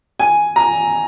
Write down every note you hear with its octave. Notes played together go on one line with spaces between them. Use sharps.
G#5
A#5